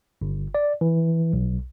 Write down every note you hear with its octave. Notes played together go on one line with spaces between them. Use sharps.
G1
D5
E3
B1